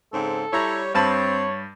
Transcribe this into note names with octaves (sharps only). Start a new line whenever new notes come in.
G#2 C#3 C4 A4
G3 E4 C#5 A#5
G2 C4 C#5 A5 B5